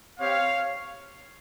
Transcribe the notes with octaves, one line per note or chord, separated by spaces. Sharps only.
C4 G4 C#5 F5